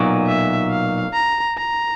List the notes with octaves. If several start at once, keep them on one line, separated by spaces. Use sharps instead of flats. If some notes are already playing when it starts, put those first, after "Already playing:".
Already playing: B1 A#2 F#3
E5
F5
A#5
A#5